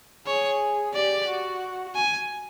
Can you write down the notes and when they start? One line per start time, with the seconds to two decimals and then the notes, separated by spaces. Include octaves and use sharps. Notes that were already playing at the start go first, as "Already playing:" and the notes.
0.26 G#4 C#5
0.94 G4 D5
1.27 F#4
1.95 G#5